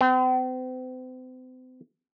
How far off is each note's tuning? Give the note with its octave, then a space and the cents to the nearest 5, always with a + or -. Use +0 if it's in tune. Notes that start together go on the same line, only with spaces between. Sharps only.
C4 -40